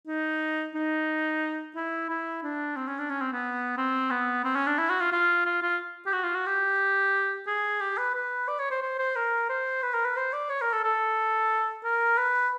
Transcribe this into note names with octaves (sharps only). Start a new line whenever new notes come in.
D#4
D#4
E4
E4
D4
C4
C#4
D4
C#4
C4
B3
C4
B3
C4
C#4
D4
E4
F#4
F4
F4
F4
F4
G4
F#4
F4
F#4
G4
G#4
G4
B4
B4
D5
C#5
C5
C5
C5
A#4
C5
B4
A#4
B4
C5
D5
C#5
A#4
A4
A4
A#4
B4